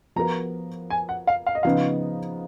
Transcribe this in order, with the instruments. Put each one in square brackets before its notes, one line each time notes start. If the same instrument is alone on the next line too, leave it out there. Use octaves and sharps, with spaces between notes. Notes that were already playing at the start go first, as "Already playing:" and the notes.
[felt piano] F3 B3 F#4 A#4 [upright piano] A#5
[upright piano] G#5
F#5
F5
F5
D#5
[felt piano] C#3 F3 B3 D#4 [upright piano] F5